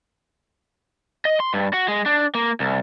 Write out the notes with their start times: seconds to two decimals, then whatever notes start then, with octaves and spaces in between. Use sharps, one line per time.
1.25 D#5
1.40 C6
1.54 G2
1.73 F#4
1.88 G#3
2.06 D4
2.35 A#3
2.60 C2